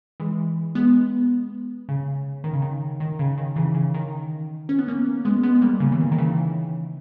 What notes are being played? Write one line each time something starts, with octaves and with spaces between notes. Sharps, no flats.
E3 G#3
G#3 B3
C#3
D#3
C#3
D#3
D#3
C#3
D#3
C#3 E3
C#3
D#3
C#4
B3
A#3 C#4
G#3 B3
G#3 B3
B3
G3 A#3
C#3
E3
D#3
D#3
C#3 E3